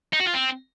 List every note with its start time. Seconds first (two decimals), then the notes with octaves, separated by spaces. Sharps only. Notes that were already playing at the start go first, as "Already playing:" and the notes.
0.13 D#4
0.20 F#4
0.27 F4
0.34 C4